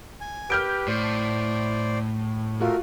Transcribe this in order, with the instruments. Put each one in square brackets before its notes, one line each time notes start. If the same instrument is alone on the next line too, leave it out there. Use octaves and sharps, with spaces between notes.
[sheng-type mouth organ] G#5
[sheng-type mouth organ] G4 B4 [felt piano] F6 G6 D7
[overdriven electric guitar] A2 [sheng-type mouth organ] C5 D5
[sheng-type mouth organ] A3 A#4 [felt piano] F4 F#4